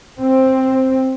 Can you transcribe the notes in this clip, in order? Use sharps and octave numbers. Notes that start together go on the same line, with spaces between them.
C4